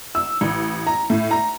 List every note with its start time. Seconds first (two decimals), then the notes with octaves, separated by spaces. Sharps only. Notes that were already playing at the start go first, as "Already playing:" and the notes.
0.15 E6
0.41 A1
0.87 A#5
1.10 A2
1.31 A#5